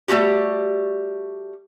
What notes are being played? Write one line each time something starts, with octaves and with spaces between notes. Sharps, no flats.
G3 A3 D#4 F#4 G4